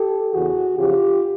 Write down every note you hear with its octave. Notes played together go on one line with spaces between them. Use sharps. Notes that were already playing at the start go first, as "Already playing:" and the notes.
Already playing: G4 A4
E2 C#3 E3 F#4 G#4
E2 C#3 F3 F4 G4